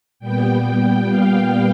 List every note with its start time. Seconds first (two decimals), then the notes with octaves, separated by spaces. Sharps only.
0.20 A#2 G3 B3 G5
1.08 F5